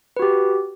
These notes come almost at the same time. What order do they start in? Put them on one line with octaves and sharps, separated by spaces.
B4 F#4 G4